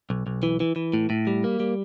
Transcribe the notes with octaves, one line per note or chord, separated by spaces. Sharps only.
B1
B1
E3
E3
E3
A2
A2
G3
A#3
G3